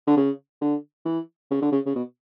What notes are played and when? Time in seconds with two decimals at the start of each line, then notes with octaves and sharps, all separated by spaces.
0.07 D3
0.17 C#3
0.62 D3
1.06 E3
1.51 C#3
1.62 D3
1.72 C#3
1.86 C#3
1.95 B2